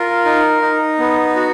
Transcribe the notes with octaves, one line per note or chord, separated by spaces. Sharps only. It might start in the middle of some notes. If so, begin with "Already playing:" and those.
Already playing: F4 A#4
D#4
D#4
B3
F#4